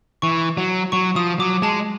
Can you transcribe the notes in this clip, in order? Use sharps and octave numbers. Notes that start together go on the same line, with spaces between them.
E3 C#6
F#3
F#3 C#6
F3 D#6
F#3 D6
G#3 A5